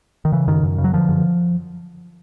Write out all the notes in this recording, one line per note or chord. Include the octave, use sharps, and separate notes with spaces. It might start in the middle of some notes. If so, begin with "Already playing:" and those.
D#3
C#3 E3
F#2 D#3
F#2
C#3
F#3
D3 F3
F#2